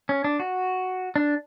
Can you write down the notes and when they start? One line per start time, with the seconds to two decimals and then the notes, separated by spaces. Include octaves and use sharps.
0.09 C#4
0.24 D4
0.40 F#4
1.16 D4